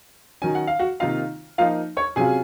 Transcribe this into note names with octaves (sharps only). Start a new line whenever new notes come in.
D#3 F#3 C#4 G#5
F#5
F5
F#4 F#5
C3 D#3 A#3 D#4 F4 F5
F3 A#3 D#4 F4 F5
C#5 C#6
C3 F#3 C#4 F4 G#4 G#5